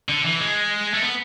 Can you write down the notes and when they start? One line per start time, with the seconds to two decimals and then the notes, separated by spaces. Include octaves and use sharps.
0.09 D3
0.25 E3
0.40 G#3
0.94 A3
1.02 B3